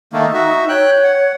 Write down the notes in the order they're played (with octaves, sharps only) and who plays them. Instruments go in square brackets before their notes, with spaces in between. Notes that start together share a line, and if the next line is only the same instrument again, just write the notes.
[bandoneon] D#3 A3 A#3 [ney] D#4
[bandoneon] F#4 E5
[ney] C#5 [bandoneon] G5 F#6
[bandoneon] F#5